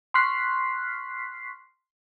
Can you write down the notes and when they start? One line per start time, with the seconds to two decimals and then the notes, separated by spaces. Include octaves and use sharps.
0.14 C6 C#6 F6 F#6 B6 C7